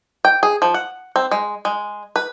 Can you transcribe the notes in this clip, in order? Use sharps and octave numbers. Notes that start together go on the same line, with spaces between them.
G5
G#4
F3
F#5
C4
G#3
G#3
B4